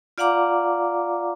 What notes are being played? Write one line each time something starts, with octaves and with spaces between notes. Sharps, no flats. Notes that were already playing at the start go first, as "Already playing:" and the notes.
F4 D5 F5 F#5 A#5 D6